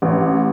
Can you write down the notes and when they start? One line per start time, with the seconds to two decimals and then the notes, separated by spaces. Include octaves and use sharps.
0.02 A1